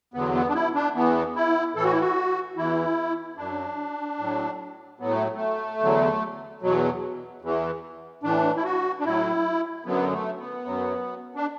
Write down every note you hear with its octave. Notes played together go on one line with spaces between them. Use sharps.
E2 D3 F#3 B3
B3
D4
E4
D4
E2 E3 B3
E4
A2 E3 A4
F#4
E4
F#4
E2 E3 E4
F#2 F#3 D4
A2 F#3
A2 F#3 B3
A3
A3
E2 D3 F#3
E2 B2 F#3
E2 E3
A2 E3 D4
E4
F#4
D4
A2 F#3 E4
F#2 D3 F#3 B3
A3
B3
F#2 F#3
D4